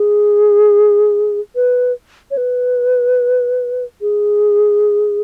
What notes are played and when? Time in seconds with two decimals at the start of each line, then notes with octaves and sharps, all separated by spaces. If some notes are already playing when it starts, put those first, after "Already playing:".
Already playing: G#4
1.56 B4
2.31 C#5
2.37 B4
4.01 G#4